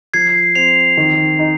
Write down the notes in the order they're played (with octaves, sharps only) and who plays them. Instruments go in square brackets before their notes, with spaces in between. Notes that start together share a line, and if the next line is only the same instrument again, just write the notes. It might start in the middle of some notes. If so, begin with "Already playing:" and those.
[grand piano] F3 [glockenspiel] G#6 C7
[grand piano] C4 [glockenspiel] C7 F7
[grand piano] D#3
D#4